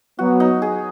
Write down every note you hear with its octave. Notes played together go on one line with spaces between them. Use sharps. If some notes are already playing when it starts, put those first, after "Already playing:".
F#3 B3 F#4
D#4
G#4